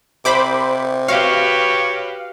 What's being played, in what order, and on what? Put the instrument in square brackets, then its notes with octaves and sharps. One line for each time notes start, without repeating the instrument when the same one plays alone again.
[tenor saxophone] C3 [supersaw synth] C5 B5 D6
[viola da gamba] F#4 G4 B4 [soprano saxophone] C#5 [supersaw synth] F5